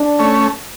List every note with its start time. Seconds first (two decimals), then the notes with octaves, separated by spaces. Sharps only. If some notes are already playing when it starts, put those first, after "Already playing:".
Already playing: D4
0.19 A3 C#4